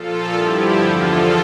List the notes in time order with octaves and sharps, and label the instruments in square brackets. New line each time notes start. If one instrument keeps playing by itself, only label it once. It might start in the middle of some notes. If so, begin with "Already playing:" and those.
Already playing: [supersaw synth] A#2 F3 F4 A4
G2 D3 F3 E4 G4
E2 D3 F3 F4 A4